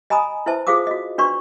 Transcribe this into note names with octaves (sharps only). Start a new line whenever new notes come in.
D#5 G#5 A#5 B5 D#6
E4 B4 C5 E5 A5
F4 G#4 C5 F5 D6 D#6
F#4 D#5
D4 F#4 B4 D5 C6 C#6